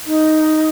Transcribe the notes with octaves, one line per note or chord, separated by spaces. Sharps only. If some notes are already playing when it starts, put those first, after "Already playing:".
D#4